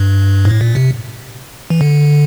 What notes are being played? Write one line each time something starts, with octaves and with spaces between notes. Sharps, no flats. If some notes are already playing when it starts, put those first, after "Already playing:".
Already playing: G2
A2
A#2
C3
E3
D3